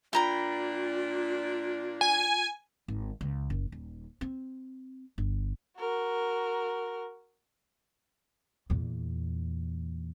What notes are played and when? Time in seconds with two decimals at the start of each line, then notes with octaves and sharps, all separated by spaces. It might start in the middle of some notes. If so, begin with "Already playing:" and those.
0.13 A#2 D4 F4 G5 A#5 B5
2.01 G#5
2.88 G#1
3.21 C#2
3.50 F#1
3.72 D#1
4.21 C4
5.18 G1
5.79 F#4 A#4
8.70 E2 A#2